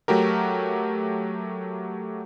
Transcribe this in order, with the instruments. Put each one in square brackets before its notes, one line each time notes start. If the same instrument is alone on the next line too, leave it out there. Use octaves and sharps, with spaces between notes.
[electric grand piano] F#3 A3 F#4 G4 A#4